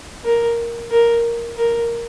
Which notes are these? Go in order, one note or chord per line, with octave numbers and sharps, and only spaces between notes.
A#4
A#4
A#4